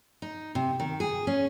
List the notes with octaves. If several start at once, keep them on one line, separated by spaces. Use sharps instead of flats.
D#4
C3
D#3
G#4
C#4